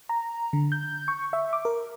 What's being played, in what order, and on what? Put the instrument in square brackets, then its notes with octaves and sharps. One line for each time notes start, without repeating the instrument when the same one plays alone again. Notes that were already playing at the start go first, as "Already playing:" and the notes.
[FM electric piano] A#5
D3
G6
C#6
E5
D6
A#4